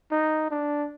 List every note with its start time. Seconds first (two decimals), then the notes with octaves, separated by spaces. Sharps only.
0.11 D#4
0.51 D4